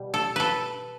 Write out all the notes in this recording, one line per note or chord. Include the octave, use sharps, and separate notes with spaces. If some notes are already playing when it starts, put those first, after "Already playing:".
Already playing: B2 G3
A4
A4 B4